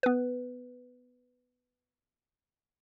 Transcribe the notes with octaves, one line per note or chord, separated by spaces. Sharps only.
B3 B4